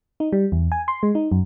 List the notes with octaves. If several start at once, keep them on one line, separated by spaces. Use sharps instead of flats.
D#4
G3
E2
G#5
C6
G#3
D#4
F#2